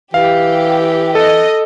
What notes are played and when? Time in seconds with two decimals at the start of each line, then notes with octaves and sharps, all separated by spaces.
0.14 E3 G4 F5
1.15 A4 D#5